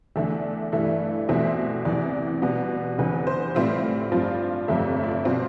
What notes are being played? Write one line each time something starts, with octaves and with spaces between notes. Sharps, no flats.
E2 D3 A3 D4 E5
G2 E3 A3 E4
E2 B2 A3 C4 E4 E5
E2 C3 E3 D5
B2 G3 B3
F1 E2 D3 B4
C5
A2 G3 C4 F4 E5
G2 F3 C4 F4
G1 F2 C3 F3 A3 E5
E5
D5
E5
B2 G3 C4 F4